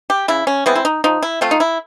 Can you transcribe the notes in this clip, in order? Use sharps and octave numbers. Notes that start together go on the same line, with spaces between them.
G4
C#3 E4
C#4
E3 G#3 B3 C4
E4
D#4
F3 D#4
E4
A3 C4 F4
D#4
E4